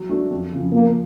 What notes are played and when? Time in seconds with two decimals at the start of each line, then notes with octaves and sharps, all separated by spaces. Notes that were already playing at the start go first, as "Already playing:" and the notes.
Already playing: F#3
0.09 A3 D4 F#4 A4
0.31 F2
0.52 C#3 F3
0.72 F3 A#3